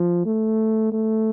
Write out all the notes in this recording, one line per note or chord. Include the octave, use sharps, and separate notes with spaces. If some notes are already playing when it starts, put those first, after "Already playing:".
Already playing: F3
A3
A3